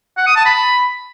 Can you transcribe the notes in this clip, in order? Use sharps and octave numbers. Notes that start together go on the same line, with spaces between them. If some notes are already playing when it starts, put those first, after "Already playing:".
F#5
D#6
A5
B5